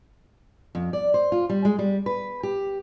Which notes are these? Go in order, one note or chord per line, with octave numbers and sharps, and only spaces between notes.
F2
D5
C5
F4
G3
G#3
G3
B4
G4